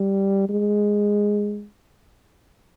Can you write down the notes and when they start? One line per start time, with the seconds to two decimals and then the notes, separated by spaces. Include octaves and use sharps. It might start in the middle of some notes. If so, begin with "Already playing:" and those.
Already playing: G3
0.49 G#3